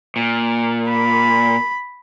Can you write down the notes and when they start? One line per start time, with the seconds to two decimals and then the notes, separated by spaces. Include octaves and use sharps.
0.16 A#2
0.89 B5